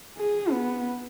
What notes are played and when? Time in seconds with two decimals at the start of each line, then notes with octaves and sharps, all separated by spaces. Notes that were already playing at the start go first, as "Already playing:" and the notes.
0.17 G#4
0.51 B3